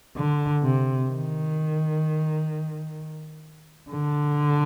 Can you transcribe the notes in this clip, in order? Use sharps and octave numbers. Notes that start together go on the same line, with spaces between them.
D3
C3
D#3
D3